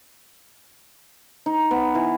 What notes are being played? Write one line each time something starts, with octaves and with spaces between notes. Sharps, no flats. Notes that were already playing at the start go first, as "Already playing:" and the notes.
D#4
B3
E3